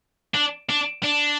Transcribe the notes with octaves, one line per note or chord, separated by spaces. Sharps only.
D4
D4
D4